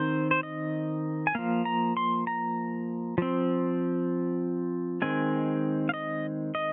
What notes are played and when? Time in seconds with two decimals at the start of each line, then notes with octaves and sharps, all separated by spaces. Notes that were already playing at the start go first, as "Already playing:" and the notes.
Already playing: D#3 C4 C5
0.31 C5
0.43 D#5
1.27 G#5
1.35 F3 A#3 F5
1.65 A#5
1.97 C6
2.27 A#5
3.18 F3 C4
5.02 D#3 G#3 C4 G#5
5.89 F5
5.94 D#5
6.55 D#5